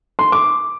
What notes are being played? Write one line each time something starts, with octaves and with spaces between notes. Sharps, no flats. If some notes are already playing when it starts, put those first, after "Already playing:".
C6
D6